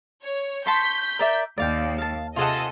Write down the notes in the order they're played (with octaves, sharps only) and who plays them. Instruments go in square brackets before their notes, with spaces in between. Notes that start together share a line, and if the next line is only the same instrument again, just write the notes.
[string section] C#5
[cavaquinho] A5 C6 C#6 [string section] G6 B6
[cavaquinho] A#4 D5 E5
[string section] D#2 [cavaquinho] D5 F5 G5
[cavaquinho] F5 A5
[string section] C3 A4 D#5 [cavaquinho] F4 G#4 F#5